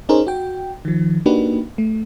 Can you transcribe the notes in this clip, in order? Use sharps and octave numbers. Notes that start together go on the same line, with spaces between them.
C#4 D#4 G#4 A#4 C5 C#5
F#4 G5
D#3 F3
A#3 D4 D#4 F#4 G4 B4
A3